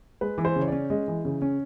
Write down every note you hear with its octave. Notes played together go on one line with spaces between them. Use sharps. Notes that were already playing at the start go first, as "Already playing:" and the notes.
G#3 B4
E3
C5
C#3
C#5
C#4 D5
G#3 D#5
E3
C#3
C#4